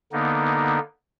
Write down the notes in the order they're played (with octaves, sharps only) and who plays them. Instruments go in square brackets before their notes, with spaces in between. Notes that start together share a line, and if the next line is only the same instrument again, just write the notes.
[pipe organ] D3 A#3 B3 D#4